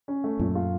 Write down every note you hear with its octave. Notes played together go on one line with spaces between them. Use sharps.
C#4
A3
F#2 A#2
F4